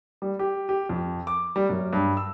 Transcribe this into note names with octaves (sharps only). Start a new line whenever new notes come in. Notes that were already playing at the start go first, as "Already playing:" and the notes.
G3
G4
G4
F2
D6
G3
F#2
G2
E6